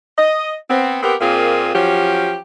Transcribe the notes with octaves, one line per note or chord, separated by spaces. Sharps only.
D#5
B3 C4
B3 C4 G4 A#4
A#2 A#3 C4 F4 G#4
F3 F#3 C#4 G4